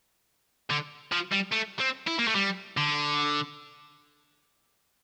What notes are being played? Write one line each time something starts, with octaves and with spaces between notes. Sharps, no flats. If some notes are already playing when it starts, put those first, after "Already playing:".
D3
F3
G3
A3
C4
E4
A#3
A3
G3
D3